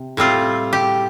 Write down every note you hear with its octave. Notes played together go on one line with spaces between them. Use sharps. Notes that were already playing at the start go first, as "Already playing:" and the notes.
Already playing: C3
A2 G3 C4 F4
G4